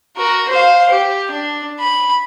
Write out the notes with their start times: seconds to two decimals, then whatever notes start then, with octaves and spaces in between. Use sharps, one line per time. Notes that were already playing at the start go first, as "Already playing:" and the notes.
0.17 F#4 A#4
0.49 C5 F5
0.90 G4
1.31 D4
1.79 B5